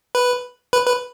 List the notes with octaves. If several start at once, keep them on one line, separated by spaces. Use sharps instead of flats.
B4
B4
B4